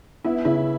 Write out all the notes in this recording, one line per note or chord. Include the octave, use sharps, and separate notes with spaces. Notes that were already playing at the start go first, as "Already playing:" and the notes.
B3 E4
C#3 E4